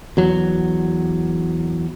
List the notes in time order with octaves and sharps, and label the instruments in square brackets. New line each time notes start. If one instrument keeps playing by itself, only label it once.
[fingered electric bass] E2 F#3